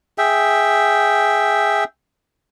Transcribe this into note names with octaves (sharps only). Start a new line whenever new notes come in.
G#4 E5 G5